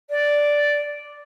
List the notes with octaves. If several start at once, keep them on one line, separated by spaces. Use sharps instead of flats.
D5